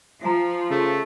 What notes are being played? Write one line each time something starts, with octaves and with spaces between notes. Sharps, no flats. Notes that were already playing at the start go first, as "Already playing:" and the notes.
F3 E5 G#5 A#5
C#3 A3